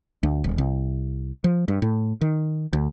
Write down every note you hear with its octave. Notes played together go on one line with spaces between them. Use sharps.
D2
D#1
C2
F3
G2
A2
D#3
D2